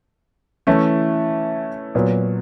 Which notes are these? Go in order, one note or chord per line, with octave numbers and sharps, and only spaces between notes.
E3 A3 C#4 E4
A#2 F#3 B3